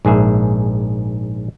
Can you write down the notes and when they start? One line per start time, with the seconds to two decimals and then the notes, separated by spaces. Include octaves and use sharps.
0.05 A#1 G#2 G#4 E5